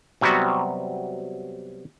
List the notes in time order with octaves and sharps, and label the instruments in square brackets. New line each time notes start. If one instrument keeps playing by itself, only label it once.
[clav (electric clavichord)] C3 F#3 G3 B3 F#4